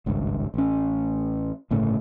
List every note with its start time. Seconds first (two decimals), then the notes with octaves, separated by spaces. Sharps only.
0.06 G#1 C#2 G2
0.54 A1 C#4
1.71 G1 A2 C#3 A3